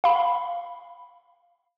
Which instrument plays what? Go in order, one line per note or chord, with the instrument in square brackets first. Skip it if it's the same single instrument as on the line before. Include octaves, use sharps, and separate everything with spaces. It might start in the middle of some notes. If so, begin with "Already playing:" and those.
[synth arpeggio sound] F5 B5